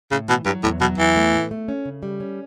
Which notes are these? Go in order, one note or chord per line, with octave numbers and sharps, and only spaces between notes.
A2 C#3
B2 E3
G2 F#3
E2 A2
B2 F#3
E2 E3
A3
A2
A3
C#4
C#3
G3
C#4